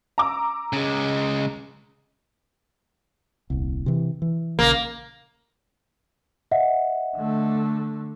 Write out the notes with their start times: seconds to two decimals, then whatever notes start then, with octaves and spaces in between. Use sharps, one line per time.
0.18 A#5 D6 E6
0.73 C#3 G#3
3.50 D#1 C2
3.86 C3 E3
4.22 E3
4.59 A#1 C#3 A#3
6.51 D#5 E5 F#5
7.17 D3 A3